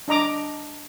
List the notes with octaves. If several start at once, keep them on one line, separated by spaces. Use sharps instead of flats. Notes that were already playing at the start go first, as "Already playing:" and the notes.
D4 D#5 A#5 D6